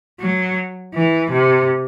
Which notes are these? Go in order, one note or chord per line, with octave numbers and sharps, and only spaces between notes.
F#3
E3
C3